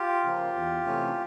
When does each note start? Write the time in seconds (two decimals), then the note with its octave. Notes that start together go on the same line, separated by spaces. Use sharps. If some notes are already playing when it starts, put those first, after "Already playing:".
Already playing: F4 G4
0.24 C#3 F3 A#3
0.55 E2
0.86 C3 E3 A3 C#4